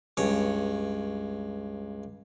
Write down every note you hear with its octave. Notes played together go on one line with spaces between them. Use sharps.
C#2 G2 C#5